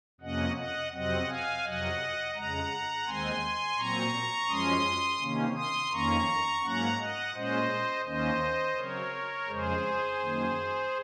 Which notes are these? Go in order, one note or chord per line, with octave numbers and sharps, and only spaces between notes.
F2 C3 F3 A#3 C#4 D#5 F#5
D#5 F#5
F2 C3 F#3 C4 D#5 F#5
F5 G#5
F2 C3 F#3 D#5 F#5
F2 C#3 G#3 F#5 A#5
D#2 D#3 G#3 C4 G#5 C6
A#2 F#3 C4 A#5 C#6
F#2 F3 G#3 C#4 C6 D#6
C3 D#3 A#3 C#4
C6 D#6
F2 D#3 A#3 C#4 A#5 C#6
G#2 F#3 A#3 C#4 F#5 A#5
D#5 F#5
A#2 G#3 C#4 C5 D#5
D#2 D#3 A#3 C#4 C5 D#5
C#3 F#3 C4 A#4 C#5
F2 C#3 G#3 G#4 C5
F#2 D#3 A#3